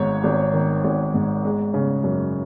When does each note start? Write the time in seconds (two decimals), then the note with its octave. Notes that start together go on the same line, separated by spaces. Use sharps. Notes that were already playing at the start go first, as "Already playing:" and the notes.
Already playing: G#1 G#2 C#5
0.24 G#1
0.53 D#3
0.84 G#1
1.14 G#2
1.44 G#3
1.74 C#3
2.04 F#2